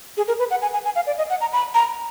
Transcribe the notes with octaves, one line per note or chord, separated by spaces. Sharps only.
G#4
A#4
B4
F#5
G#5
G#5
G#5
F5
D5
D#5
F#5
A#5
B5
A#5